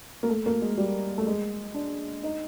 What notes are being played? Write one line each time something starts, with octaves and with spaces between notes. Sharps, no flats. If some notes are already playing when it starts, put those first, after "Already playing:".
A#3
A3
A#3
G#3
G3
A3
G#3
D4
D#4